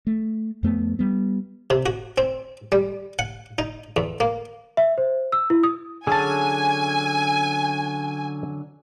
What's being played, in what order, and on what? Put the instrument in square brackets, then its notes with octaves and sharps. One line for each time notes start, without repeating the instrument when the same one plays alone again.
[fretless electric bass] A3
F2 A3 B3
G3 B3
[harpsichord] C3
F#4
C4
G3
F#5
D#4
E2
A#3
[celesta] E5
C5
E6
E4
D#6
[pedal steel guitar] D3 F#3 C#4 [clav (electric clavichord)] G#4 A5 [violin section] G#5